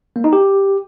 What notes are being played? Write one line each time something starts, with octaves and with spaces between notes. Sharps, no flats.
A#3
D#4
G4